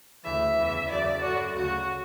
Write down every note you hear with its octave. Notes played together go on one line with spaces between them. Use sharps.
D2 C#3 E3 E5
E2 C#3 E3
F#2 C#3 F#3 D5
F#2 D3 F#3 F#4
D2 C#3 F#3 F#4